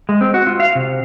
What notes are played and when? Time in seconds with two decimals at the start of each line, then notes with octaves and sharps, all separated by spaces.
0.09 G#3
0.21 C4
0.34 F#4
0.47 F4
0.60 F5
0.75 C3